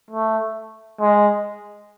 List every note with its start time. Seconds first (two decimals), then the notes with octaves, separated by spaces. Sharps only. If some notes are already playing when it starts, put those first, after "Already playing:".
0.10 A3
1.00 G#3